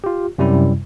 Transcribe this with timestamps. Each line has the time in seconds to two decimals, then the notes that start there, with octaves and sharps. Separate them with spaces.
0.04 F4 G4
0.38 F#2 C3 G3 E4